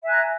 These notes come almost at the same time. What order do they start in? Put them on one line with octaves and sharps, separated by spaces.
E5 G#5 F#6 A#5